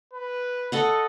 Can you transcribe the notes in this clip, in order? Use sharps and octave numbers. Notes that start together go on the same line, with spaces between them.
B4
A4 D#5 F#5